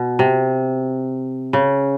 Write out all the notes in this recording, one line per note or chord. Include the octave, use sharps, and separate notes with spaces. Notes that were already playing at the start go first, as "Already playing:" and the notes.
Already playing: B2
C3
C#3